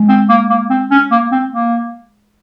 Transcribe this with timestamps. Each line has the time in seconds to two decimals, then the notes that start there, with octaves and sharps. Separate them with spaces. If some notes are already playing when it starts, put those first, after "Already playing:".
Already playing: G#3
0.09 C4
0.29 A#3
0.50 A#3
0.70 C4
0.91 C#4
1.11 A#3
1.32 C4
1.52 A#3